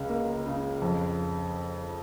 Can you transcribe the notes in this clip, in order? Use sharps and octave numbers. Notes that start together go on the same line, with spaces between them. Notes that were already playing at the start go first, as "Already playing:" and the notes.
Already playing: C#2 C#3
A#3
C#3
F2